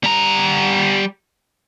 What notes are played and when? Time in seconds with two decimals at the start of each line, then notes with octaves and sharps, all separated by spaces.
0.04 G3 A#5